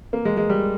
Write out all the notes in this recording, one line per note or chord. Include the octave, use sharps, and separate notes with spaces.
A#3
G#3
G#3
G3